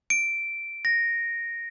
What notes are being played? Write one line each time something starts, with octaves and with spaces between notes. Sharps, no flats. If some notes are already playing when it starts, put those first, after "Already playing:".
D7
A#6